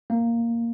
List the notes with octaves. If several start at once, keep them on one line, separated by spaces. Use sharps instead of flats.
A#3